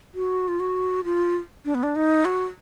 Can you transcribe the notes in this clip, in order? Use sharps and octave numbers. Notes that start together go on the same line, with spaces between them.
F#4
F4
F#4
F4
D4
B3
D4
D#4
F#4